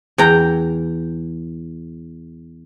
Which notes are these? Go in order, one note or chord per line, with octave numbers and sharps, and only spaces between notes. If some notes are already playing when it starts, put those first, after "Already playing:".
E2 G5 A#5